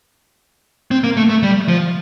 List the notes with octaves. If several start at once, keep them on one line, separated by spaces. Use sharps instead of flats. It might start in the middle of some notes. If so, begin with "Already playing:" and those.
C4
A#3
A3
A3
G3
F3